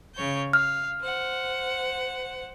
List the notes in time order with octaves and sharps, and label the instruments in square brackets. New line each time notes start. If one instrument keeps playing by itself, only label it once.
[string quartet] C#3 C#5 G6
[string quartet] F5 [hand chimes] F6
[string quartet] C5 F#5